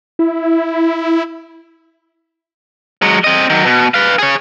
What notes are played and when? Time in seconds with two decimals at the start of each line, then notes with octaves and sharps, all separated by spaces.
0.19 E4
3.02 F#3 G#3
3.24 C4 D#5
3.50 D#3 F#3
3.65 B2
3.94 B4 F5
4.19 G#4 C#5